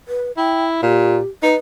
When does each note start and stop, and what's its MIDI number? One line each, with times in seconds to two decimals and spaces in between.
0.08 0.32 71
0.37 0.78 64
0.37 0.65 79
0.83 1.20 46
0.83 1.27 67
1.43 1.55 63
1.43 1.57 71